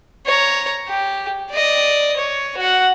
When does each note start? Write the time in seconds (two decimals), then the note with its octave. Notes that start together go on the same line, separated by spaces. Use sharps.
0.27 C#5 A#5
0.89 G4
1.51 D5 D#5
2.17 C#5
2.58 F#4 F#5